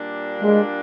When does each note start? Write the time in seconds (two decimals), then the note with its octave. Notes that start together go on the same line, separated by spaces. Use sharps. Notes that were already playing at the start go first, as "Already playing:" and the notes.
Already playing: A#2 G3 A#3 D4
0.42 G#3